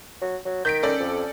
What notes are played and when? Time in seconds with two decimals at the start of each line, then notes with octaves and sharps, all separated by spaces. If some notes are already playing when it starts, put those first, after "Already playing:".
0.22 F#3
0.45 F#3
0.65 D#3 G6 B6 D7
0.82 C#4 A4 D5
1.00 F2